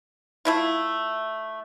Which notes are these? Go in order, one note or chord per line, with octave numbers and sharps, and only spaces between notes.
A3 E4 F4